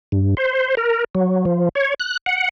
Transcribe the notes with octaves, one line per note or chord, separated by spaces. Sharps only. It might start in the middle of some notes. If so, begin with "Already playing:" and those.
G2
C5
A#4
F#3
F3
C#5
F#6
F#5